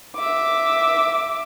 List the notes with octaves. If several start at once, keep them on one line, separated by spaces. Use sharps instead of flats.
E5 D6